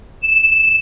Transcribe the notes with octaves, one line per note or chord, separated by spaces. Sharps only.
E7